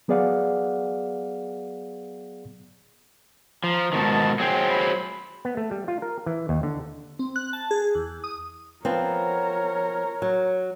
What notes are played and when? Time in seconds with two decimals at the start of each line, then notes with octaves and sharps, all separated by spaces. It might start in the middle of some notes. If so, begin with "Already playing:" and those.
0.08 F#3 B3 G#4 D5 F5 F#5
3.64 F3 A#5
3.93 G#2 B2 D#3 A5
4.39 F#3 G#4 C5 G5
4.69 B5
5.45 B3
5.57 A3
5.71 G3
5.88 F4
6.02 A#4
6.26 E3
6.49 D#2
6.63 D3
7.19 C4
7.36 F#6
7.53 A5
7.71 G#4
7.95 E2
8.24 D#6
8.85 F3 B3 C4 A#4 C#5
10.22 F#3